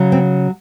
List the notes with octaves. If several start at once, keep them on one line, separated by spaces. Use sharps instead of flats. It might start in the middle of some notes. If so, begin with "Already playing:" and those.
Already playing: C#3 F#3
C4